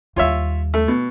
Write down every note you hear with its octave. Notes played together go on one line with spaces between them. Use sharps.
D#2 G3 F4 C#5 E5
A3
B2